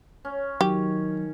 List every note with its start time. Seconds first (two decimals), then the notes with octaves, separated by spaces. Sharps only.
0.25 C#4
0.61 D#3 F#3 G4